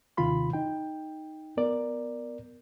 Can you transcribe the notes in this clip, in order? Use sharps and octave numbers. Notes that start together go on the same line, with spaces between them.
D#2 C3 D#3 F4 B5 C6
D#4 G5
B3 A#4 D5